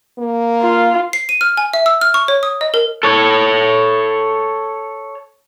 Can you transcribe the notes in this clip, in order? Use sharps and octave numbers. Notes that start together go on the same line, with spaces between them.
A#3
F4
C7
D#7
F6
G#5
E5
E6
F6
C#6
C#5
D#6
D#5
A#4
A4 C#5